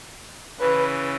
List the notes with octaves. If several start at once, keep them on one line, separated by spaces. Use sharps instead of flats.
C#3 E3 B4